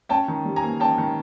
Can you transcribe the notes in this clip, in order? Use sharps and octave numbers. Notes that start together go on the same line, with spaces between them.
C#4 G5 A5
D#3
G3
G#5 A#5
A#3
C#4 G5 A5
D#3